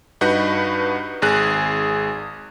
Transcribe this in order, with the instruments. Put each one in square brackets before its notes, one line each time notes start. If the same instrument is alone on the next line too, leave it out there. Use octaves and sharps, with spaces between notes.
[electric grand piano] G2 D#4 F#4 B4 F#5 G6
G#1 G#4 F#6